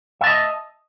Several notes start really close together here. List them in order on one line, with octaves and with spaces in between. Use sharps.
E5 A5 D#5